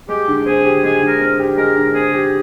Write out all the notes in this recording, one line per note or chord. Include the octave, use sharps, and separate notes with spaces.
G#3 G4
D3
C4 G#4
G4
G#3 G#4
D3
A#4
C4
G4
G#3 A#4
D3
C4 G#4
G4